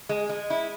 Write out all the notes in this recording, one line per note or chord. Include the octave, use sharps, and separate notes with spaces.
G#3
G#3
E4